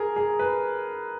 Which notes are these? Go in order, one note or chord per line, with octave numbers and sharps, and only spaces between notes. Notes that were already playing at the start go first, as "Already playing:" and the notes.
Already playing: G#4 A#4
G#4
B4